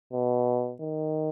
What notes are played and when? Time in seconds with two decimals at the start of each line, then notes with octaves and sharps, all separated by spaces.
0.13 B2
0.81 D#3